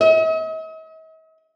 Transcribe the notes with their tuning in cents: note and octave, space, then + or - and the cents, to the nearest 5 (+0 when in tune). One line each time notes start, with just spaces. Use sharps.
D#5 +45